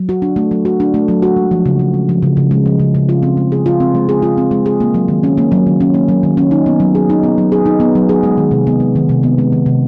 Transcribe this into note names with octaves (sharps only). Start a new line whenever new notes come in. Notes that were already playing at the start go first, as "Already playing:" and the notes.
Already playing: F#3
F#4
D4
A3
F#3
F#4
D4
A3
F#3
F#4
G#3
F3
C#3
C#3
G#3
F3
C#3
C#3
G#3
F3
C#3
C#3
F4
C4
G#3
G#4
F4
C4
G#3
G#4
F4
C4
G#3
G#4
A#3
F#3
D#3
C#4
A#3
F#3
D#3
C#4
A#3
F#3
D#3
C#4
D#4
B3
F#3
G#4
D#4
B3
F#3
G#4
D#4
B3
F#3
G#4
G#3
D#3
C3
B3
G#3
D#3
C3
B3
G#3
D#3
C3